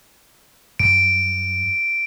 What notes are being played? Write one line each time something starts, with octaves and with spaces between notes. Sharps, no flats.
F#2 G3 D7